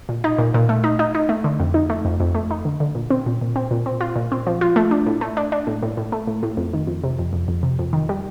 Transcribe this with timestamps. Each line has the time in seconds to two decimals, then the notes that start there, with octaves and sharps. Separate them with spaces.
0.09 A#2
0.24 D#4
0.38 A#2
0.54 A#2
0.69 A3
0.84 D#4
0.99 D#4
1.15 D#4
1.29 A3
1.44 D3
1.60 F2
1.74 D#4
1.90 A3
2.05 F2
2.20 F2
2.35 A3
2.51 D#4
2.65 D3
2.80 D3
2.95 A#2
3.10 C4
3.26 A#2
3.41 A#2
3.56 C4
3.71 A#2
3.86 C4
4.01 F4
4.16 A#2
4.32 C4
4.47 F3
4.61 F4
4.76 A3
4.91 D4
5.06 A2
5.21 A3
5.37 D4
5.52 D4
5.67 A2
5.83 A2
5.97 A2
6.12 A3
6.27 A2
6.43 A2
6.57 F2
6.73 D#3
6.87 F2
7.04 C3
7.19 F2
7.33 F2
7.48 F2
7.63 C3
7.79 F2
7.93 D#3
8.09 G3